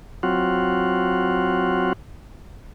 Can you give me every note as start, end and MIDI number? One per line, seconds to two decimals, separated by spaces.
0.23 1.93 54
0.23 1.93 60
0.23 1.93 65
0.23 1.93 66